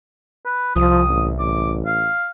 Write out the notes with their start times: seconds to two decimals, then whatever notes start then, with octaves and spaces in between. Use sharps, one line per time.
0.45 B4
0.76 C2 F3 D#6
1.09 A1
1.40 A1 D6
1.86 F5